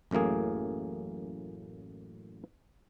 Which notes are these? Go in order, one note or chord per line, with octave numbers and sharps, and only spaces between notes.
A1 F#2 A2 A#3 G#4